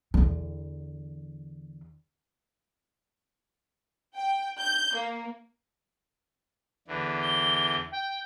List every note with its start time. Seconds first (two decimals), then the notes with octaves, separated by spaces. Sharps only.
0.14 E2 D3
4.15 G5
4.59 G6
4.94 A#3
6.88 E2 D3 E3
7.22 G7
7.92 G5